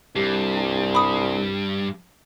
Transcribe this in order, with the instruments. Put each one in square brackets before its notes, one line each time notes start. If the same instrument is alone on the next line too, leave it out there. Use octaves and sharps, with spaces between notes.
[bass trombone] C2 [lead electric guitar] G2 [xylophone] G4
[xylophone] B5 D#6